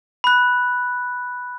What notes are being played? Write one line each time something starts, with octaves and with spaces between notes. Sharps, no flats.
B5 F#6